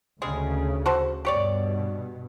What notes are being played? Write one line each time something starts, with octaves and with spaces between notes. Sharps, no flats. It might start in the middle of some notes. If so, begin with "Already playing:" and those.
D2 C#3 G3 G#3 G#4
F#4 A4 C5
G2 B2 G4 C#5 D5